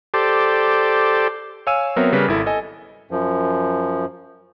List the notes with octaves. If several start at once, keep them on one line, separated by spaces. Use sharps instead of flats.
G4 A4 C5 D5
C#5 F5 G#5 E6 D#7
F#3 B3 C4 A#4 C#5 E5
C#3 G3 A#4 B4
G#1 E4 A4
A4 D#5 G#5
F#2 F3